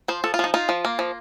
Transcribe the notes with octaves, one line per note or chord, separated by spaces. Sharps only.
F3 C5
F3 A4
F4
F3 D#4
D#4 F4
F3
A#3
F3